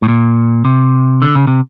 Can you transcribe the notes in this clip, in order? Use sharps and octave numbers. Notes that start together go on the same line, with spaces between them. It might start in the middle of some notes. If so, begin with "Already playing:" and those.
A2
A#2
C3
D3
C#3
C3